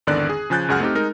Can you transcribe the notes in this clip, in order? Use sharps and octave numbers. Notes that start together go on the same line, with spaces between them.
G#1 E2 D3 D#3 D5 F#6
G#4
C#3 F3 G#5 F#6 G6 A6
C#2 F#2 G#4 F#5 F6
A3 C4 D#4 G4
G#3 D#4 A#4